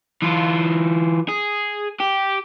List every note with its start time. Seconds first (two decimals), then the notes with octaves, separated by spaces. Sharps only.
0.22 E3 F4
1.29 G#4
2.00 G4